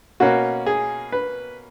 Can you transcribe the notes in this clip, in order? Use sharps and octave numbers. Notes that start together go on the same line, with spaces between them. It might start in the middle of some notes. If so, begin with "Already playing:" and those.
B2 A#3 C#4 F#4
G#4
B4